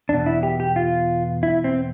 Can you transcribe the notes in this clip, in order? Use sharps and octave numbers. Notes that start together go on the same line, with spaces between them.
E2 B2 D4
E4
G4
G4
F4
E4
C4